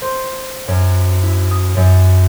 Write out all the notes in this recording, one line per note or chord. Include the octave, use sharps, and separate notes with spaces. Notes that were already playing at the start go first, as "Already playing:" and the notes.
C5
F#2
E4
D#6
F#2